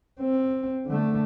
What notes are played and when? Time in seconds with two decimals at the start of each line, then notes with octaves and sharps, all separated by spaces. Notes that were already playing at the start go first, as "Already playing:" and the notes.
0.21 C4
0.86 D3 A3